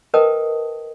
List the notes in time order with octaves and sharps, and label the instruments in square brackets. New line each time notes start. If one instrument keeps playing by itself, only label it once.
[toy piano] A#4 B4 D#5 G5 A5 D#6